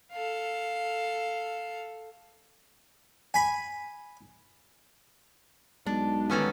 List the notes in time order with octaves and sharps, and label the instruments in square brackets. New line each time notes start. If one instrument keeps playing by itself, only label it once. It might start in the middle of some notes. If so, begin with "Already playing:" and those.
[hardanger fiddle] A4 F5
[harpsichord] G#5 B5
[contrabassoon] B1 [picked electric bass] G#3 [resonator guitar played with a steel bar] D4
[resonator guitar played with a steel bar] G2 D3 D#3 [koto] B3 C#4 A4